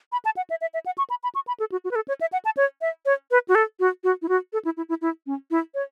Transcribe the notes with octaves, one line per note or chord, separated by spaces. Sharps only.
B5
A5
F#5
E5
E5
E5
F#5
C#6
B5
B5
C#6
B5
A4
F#4
F#4
B4
A4
C#5
E5
F#5
A5
C#5
E5
C#5
B4
F#4
A4
F#4
F#4
E4
F#4
A4
E4
E4
E4
E4
C#4
E4
C#5